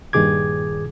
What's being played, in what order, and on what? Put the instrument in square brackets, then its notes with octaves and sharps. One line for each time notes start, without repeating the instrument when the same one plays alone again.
[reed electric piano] G2 A#2 D#3 G#4 D6 G#6